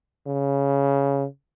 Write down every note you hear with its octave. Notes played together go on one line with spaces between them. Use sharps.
C#3